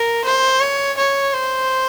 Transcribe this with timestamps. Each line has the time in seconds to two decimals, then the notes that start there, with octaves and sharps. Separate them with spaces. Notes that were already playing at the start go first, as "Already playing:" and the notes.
Already playing: A#4
0.25 C5
0.61 C#5
0.97 C#5
1.34 C5